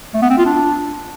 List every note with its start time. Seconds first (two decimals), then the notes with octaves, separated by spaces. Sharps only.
0.14 A3
0.22 B3
0.30 C4
0.38 F4
0.46 D4